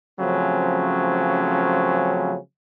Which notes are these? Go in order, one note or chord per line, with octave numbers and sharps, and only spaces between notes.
C#3 F3 F#3 A3 C4 C#4